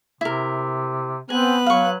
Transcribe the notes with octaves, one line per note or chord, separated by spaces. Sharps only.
C3 E4 A#4
B3 C4 B4 G#5 F#6
F#3 F5 C#6